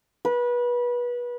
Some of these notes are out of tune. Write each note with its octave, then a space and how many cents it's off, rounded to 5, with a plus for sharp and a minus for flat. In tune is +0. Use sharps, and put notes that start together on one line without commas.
B4 -25